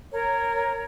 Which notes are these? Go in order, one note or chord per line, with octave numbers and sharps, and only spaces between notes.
A#4 C#5